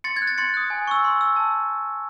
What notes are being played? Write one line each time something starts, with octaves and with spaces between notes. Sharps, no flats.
C6 A6 C#7
G#6
F#6
A6
C6 A6 C#7
D#6 F#6
G#5
C#6 E6
C6
E6
A5